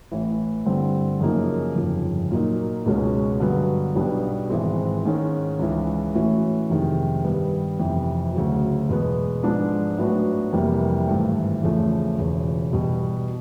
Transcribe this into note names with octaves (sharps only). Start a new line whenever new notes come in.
A1 A2 E3
G2 D3 G3 C4
F#2 C#3 F3 A#3 D#4
G1 F2 C#3 F3
A#2 F#3 A#3 D#4
C#2 B2 G#3 C#4 F#4
G2 D3 F#3 B3
B1 B2 G3 B3 D4
G#1 G#2 E3 G#3 C4
G#2 D#3 G#3 C#4
C#2 C#3 E3
A2 E3 A3 C#4 F#4
F2 C3 D#3 G#3
G2 D#3 G3 B3
F2 C3 E3
D2 C#3 F#3
E2 B2 G#3 B3
G#2 F3 G#3 B3 D4
A2 F#3 B3 D4 F#4
F2 C3 E3 G3 A#3
G#1 G2 E3 A3
E2 C#3 F3 A3
E1 E2 C#3
E2 B2 G3